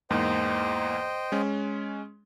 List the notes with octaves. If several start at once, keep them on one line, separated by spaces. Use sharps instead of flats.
E2 G#2 A#3 C5 D#5 G5
G#3 C#4